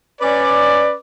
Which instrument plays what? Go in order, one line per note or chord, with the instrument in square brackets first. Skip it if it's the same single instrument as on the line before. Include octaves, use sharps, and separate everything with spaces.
[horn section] C#4 B4 D5